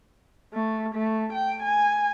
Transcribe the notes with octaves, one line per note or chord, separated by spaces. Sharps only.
A3
A3
G5
G#5